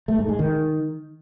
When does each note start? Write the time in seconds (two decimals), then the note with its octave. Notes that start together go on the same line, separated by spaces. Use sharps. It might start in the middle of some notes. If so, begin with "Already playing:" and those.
0.08 A3
0.19 G#2
0.29 G#3
0.39 D#3